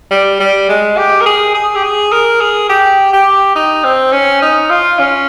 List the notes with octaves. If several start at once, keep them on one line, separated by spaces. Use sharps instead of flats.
G3
G3
G#3
G4
A#4
G#4
G#4
G4
G#4
A#4
G#4
G4
G4
D#4
C4
C#4
D#4
F4
C#4